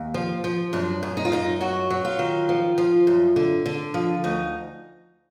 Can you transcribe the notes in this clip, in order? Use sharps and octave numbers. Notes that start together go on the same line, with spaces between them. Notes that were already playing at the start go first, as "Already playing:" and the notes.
Already playing: D#2
F3
F3
F#2 D4
F#2
D#4
F4
F#2 D#4
F#3 F#4
F#3
F4
D#3
F3
F3
F#2
D3
D3
F3
D2 D#4